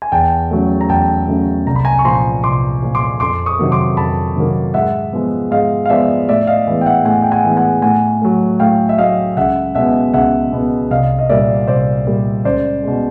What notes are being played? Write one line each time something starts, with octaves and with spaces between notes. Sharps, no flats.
G#5
E2 G5 A5
C#3 F#3 A3
A#5
E2 G5 A5
C#3 F#3 A3
C2 A#5
B5
G#5 A#5
C#6
A#2 F3 A#5 C6
C2 C6 D6
A#2 F3
C6 D6
F2 C6 D6
C#6 D#6
C3 D#3 F#3 A#3
C6 D6
F2 A5 B5
C3 D#3 F#3 A#3
G#2 E5 F#5
F3 G#3 B3
G#2 D#5 F5
F5
F3 G#3 B3 D5 E5
A2 D5 E5
D#5 F5
E3 G#3 B3
G5
E5 F#5
A2 F#5 G#5
G5
F#5 G#5
E3 G#3 B3
F#5 G#5
A2 F#5 G#5
F#3 A3
A2 F5 G5
E5
F#3 A3 D#5 F5
C#2 E5 F#5
B2 G#3 B3 E5 F#5
C#2 E5 F#5
B2 G#3 B3
C2 D#5 F5
D#5
A#2 G3 A#3 D5 E5
C2 C5 D5
A#2 G3 A#3
C#2 C5 D5
B2 G#3